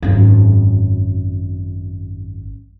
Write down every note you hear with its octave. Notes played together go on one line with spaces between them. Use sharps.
G#1 F#2